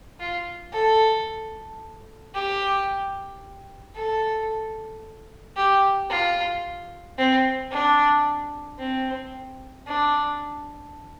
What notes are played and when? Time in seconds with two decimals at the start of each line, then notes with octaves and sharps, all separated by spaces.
0.20 F4
0.73 A4
2.34 G4
3.95 A4
5.56 G4
6.10 F4
7.18 C4
7.71 D4
8.79 C4
9.87 D4